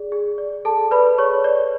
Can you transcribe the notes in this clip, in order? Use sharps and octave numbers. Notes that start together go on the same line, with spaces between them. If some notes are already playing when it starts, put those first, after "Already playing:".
Already playing: G#4 D5
G#4
D5
G#4 A4 A5
B4 D5 B5
G#4 C#5 C#6
D5